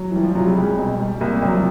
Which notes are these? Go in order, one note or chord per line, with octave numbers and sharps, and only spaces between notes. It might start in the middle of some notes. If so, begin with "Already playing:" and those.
Already playing: F#3
E3 G3
F3
C2 F#3
G3
C2 G#3
B2
G3
C2 A#3
C2 F#3
F3